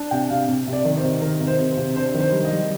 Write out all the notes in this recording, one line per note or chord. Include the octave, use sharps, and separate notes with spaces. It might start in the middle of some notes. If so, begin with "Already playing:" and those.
Already playing: D4
C3 G5
C3 F5
C3
C3
D5
D#3
C5
C3
D#3 A#4
C3
C5
C3
C5
C3
D4 C5
D#3
C5
G3
D#5
G3